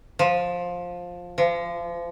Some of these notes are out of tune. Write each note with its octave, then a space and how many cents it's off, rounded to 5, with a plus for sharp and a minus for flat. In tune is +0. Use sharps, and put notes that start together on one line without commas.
F3 +15
F3 -30